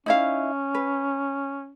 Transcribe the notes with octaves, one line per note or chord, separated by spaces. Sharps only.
C#4 D#4 E4 F5
B4